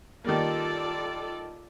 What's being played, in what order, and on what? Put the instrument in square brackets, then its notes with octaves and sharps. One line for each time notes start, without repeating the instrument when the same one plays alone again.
[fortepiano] D#3 G3 A#3 [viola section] F4 A4 D5